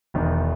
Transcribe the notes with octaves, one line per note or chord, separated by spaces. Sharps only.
E1 E2 D#3